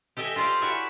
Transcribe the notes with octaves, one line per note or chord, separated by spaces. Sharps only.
G4 A4 D#5 E5 G5 G#5
F4 G4 C5 D5 F5
E4 F#4 C#5 D5 E5 G#5